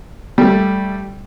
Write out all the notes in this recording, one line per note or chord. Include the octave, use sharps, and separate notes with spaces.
G3 A3